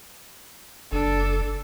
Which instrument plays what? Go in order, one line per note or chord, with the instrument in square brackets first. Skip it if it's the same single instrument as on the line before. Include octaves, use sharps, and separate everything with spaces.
[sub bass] F#1 [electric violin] D4 A4